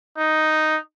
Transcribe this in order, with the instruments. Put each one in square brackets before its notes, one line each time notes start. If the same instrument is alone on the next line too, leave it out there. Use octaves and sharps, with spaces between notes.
[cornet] D#4